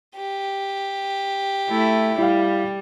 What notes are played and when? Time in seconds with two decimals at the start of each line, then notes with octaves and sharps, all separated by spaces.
0.17 G4
1.70 A3 E4
2.18 G3 E4 F5